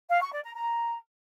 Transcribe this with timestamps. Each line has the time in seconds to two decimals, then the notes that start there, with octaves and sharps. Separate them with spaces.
0.09 F5
0.21 C#6
0.32 D5
0.44 A#5
0.55 A#5